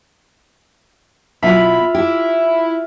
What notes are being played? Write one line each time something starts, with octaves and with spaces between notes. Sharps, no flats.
B2 F#3 E4 F4 E5 F5 B5
E4 G4